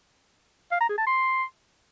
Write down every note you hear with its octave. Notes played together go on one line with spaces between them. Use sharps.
F5
A#5
G#4
A5
C6